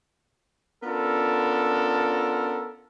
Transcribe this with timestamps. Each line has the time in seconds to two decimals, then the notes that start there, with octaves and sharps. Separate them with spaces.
0.83 B3 C#4 D4 F4 A4 A#4